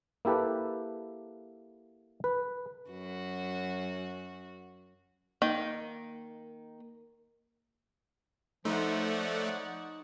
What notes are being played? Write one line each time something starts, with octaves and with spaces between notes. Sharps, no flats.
A#3 E4 G4 A4 B4
B4
F#2 F#4
D#3 A#3
F3 A3 D#4 C#5 D5 F#5 C6